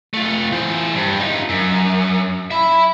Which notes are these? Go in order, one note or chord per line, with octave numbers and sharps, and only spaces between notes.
A3 F4
E3 C5
G2 G3
D#4 F4
F#2
E5 B5